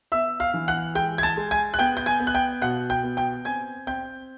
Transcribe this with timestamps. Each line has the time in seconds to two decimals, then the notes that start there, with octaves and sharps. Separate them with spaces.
0.12 B3 E5 E6
0.40 F5 F6
0.54 E3
0.68 F#5 F#6
0.95 G#3 G5 G6
1.18 G#6
1.23 A5 A6
1.37 G#3
1.51 G#5 G#6
1.74 F#6
1.79 B3 G5 G6
1.97 G6
2.06 G#5 G#6
2.20 B3
2.27 F#6
2.35 G5 G6
2.62 B2 F#5 F#6
2.90 G5 G6
3.03 B3
3.17 G5 G6
3.45 C4 G#5 G#6
3.87 C4 G5 G6